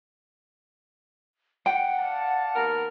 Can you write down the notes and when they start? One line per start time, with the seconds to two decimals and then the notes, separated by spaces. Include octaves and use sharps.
1.66 F#5 G5
1.99 D5 F5 A5
2.56 D#2 B3 A#4